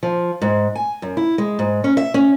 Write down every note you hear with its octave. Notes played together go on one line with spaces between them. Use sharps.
F3
G#2
G#5
F#2
E4
G#3
G#2
C#4
E5
C#4